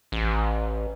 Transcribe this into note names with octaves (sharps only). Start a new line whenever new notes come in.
A1